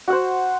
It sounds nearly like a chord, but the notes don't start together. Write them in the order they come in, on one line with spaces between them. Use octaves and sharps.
F#4 F#5 C5